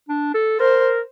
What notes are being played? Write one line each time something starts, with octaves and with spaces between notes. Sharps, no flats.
D4
A4
A#4 C5